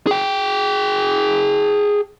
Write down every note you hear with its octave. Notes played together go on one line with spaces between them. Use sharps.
G#4 G5